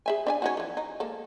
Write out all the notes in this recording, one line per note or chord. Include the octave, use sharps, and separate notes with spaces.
G#4 E5 G#5
D4 E5 G#5
C#4 D#4 F#4
E3 F3
D#4
G#3 A#3 A4